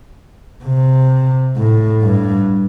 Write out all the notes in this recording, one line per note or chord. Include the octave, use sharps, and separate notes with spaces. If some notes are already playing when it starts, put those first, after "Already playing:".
C3
A2
G2